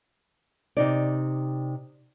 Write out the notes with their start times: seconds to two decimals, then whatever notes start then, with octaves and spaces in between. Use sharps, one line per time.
0.77 C3 D#4 D5